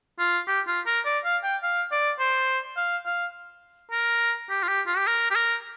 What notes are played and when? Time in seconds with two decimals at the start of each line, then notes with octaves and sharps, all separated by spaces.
0.19 F4
0.47 G4
0.67 F4
0.86 A#4
1.05 D5
1.25 F5
1.44 G5
1.63 F5
1.92 D5
2.19 C5
2.77 F5
3.06 F5
3.91 A#4
4.50 G4
4.63 F4
4.68 G4
4.87 F4
4.97 G4
5.07 A#4
5.31 G4
5.35 A#4